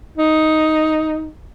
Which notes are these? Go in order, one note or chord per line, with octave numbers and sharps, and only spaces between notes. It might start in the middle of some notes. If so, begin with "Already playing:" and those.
D#4